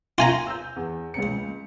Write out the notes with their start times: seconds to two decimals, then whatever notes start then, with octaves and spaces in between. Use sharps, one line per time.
0.18 F4 G#5 A#5
0.47 E6 G6
0.76 E2
1.14 C#2 C#3 C#7